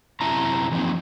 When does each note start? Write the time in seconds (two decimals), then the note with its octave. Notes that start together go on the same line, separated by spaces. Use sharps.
0.21 F#2 C3 E4 A5 A#5
0.71 E3 F3 A#3 C4 D#4